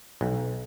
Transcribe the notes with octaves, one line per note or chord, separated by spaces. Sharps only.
B1